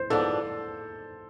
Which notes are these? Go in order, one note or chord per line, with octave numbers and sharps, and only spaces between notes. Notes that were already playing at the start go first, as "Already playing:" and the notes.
Already playing: C5
G#2 F3 B3 D4 A4